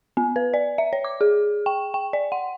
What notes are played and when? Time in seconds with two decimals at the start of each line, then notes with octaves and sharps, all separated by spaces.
0.17 B3
0.36 B4
0.54 D5
0.78 E5
0.93 C#5
1.04 D6
1.21 G#4
1.66 G5
1.94 G5
2.13 D5
2.32 F#5